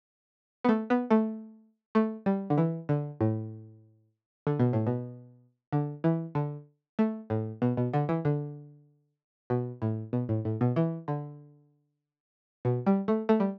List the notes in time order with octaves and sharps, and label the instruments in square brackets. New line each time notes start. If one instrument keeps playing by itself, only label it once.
[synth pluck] B3
A3
B3
A3
A3
G3
D3
E3
D3
A2
D3
B2
A2
B2
D3
E3
D3
A3
A2
B2
B2
D3
E3
D3
B2
A2
B2
A2
A2
B2
E3
D3
B2
G3
A3
A3
G3